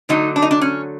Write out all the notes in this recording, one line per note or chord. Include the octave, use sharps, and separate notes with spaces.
D3 F#3 A3 D#4
D4
D#4
D4
C#4